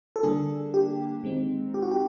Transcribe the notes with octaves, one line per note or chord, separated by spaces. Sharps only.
A4
D3 G3 A#3 D4 G#4
G4
D#3 G#3 C4 D#4
G4
F#4
G4